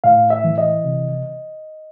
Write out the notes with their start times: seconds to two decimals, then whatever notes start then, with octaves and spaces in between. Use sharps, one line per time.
0.04 A2 F5
0.30 E5
0.44 E3
0.58 D#5
0.85 C3